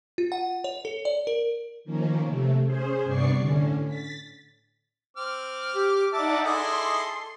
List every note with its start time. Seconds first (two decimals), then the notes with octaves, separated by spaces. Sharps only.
0.18 F4
0.32 F#5
0.64 C#5
0.85 A4
1.05 D5
1.27 A#4
1.84 D#3 F3 A#3 C#4
2.24 C3 A3
2.64 C#4 G#4 C5
3.04 G2 C3 B3 D5 C#6 C7
3.36 A2 D3 C#4
3.85 A6 B6
5.17 C4 D6 F6
5.75 G4
6.13 D#4 D5 E5 F#5 A5 D6
6.45 E4 G#4 A4 D5 D#5 C6 C7